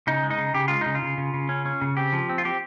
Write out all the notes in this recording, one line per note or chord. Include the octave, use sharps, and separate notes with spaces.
C#3 D#4
G#3
D#4
C#3
C#3 G4
G#3 F4
C#3 D#4
F4
C#3
C#3
C#3
C#4
C#4
C#3
C4 G4
F3
C4
F4
C4 G4